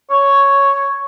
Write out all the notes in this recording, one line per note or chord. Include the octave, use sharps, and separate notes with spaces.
C#5